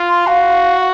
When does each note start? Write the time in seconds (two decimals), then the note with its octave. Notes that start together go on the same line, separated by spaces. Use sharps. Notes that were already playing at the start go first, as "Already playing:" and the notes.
Already playing: F4
0.09 C6
0.27 F#4 F5